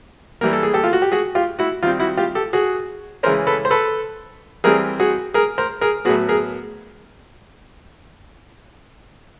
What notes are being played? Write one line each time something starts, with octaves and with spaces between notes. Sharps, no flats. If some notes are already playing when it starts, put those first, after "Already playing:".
E3 G3 A#3 A#4
A4
G#4
G4 A4
F4
F#4
G4
F#4 G#4
F4 G4
E4 F#4
D#3 G3 C4 F4
E4 F#4
F4 G4
G4 A4
F#4 G#4
C#3 E3 G#3 C#4 A#4 C5
A4 B4
C5
A4 B4
E3 G3 C4 G#4 A#4
F#4 G#4
G#4 A#4
A#4 C5
G#4 A#4
A2 F#3 B3 F#4 G#4
G#4 A#4